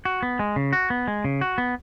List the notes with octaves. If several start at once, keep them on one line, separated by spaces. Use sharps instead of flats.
F#4
B3
G#3
C#3
F#4
B3
G#3
C#3
F#4
B3